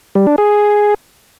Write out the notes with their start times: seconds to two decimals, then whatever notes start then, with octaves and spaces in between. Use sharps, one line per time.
0.15 G3
0.27 D4
0.38 G#4